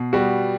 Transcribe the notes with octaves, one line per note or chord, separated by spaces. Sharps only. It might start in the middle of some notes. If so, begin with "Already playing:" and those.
Already playing: B2
G3 B3 F#4